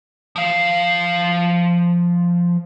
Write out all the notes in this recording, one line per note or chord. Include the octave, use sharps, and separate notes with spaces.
F3 F5